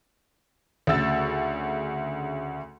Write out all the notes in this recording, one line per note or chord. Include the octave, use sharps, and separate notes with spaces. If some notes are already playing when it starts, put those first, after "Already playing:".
D2 C#3 E6 A6